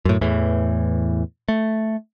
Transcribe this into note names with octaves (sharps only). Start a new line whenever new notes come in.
F#2 A2
E2 A2 E3
A3